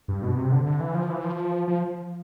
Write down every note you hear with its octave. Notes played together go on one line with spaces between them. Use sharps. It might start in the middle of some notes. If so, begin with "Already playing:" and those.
G2
B2
C3
D3
D3
E3
F3
E3
F3
F3